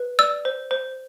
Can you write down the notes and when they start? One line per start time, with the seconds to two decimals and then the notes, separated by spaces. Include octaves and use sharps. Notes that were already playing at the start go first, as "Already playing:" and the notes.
Already playing: B4
0.19 D5 E6
0.45 C5
0.71 C5